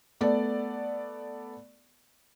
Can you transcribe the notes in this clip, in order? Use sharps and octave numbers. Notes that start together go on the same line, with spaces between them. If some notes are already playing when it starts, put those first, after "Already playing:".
A3 B3 D5